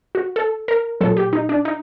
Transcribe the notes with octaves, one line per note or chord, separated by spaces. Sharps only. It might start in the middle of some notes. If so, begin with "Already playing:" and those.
F#4
A4
A#4
A#2 F#3 A4
G4
D#4
D4
D#4